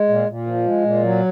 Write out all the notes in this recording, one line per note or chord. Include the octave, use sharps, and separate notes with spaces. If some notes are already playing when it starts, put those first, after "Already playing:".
Already playing: G#3
A#2
A#2
F3
G#3
A#2
F#3